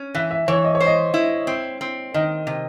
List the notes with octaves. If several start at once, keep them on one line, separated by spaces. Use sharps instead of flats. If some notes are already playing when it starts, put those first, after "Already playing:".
Already playing: C#4
E3 E5
E5
E3 C#5
D#5
C#5
C5
D#5
E4
C4
C4
D#3 D#5
C3